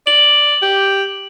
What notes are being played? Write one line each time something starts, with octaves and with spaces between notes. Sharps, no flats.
D5 F#7
G4